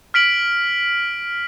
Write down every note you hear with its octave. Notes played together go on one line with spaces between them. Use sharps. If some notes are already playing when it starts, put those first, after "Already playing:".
F6 B6 D7 F#7